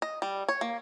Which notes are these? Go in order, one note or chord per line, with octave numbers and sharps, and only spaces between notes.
D#5
G3
C#5
A#3